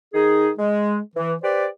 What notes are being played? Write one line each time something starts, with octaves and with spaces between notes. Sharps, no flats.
D#3 D#4 G#4
G#3
E3
G4 B4 C5 D5